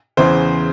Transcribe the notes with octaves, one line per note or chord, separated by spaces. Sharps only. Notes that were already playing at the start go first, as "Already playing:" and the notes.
E2 C#3 E3 C5